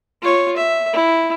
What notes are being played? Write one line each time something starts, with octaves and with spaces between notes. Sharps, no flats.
F4 C#5
E5
E4